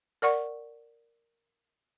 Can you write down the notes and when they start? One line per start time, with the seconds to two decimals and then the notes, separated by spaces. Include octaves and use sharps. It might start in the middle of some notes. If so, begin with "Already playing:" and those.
0.22 A#4 D5 F#5 C#6